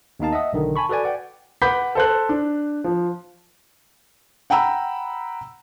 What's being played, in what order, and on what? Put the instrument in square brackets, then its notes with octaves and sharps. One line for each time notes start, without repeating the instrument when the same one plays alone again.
[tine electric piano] D#2 B3 D#4 F5 A5
D#5 E5 F#5 D#6
B1 D3 D#3
G#5 A5 B5 C#6
F#4 A4 B4 D5 G#5
D5 F#5 G5
[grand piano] B4 F#5 B5 D6 G6 B6
A4 C5 F#6
D4
F3
[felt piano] F#5 G5 A#5 B5 E6